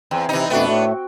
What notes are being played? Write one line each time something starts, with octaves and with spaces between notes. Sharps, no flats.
E2 C4
C3 E3 D#4
F2 B2 A3 B3 D4 F#4 G5
A2 A3